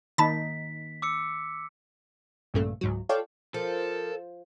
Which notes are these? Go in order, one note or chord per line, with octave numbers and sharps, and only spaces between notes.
D#3 A#3 D#4 A5 B5 A6 B6
D6 E6 C#7
A#1 G2 A#2 C#3 A3
C#2 G#2 F#3
F4 A4 C#5 D5 F5 G5
F3 A4 A#4